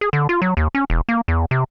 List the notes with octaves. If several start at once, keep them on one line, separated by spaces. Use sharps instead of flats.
G#4
D3
F4
F#3
D#2
C#4
E1
A#3
E2
C3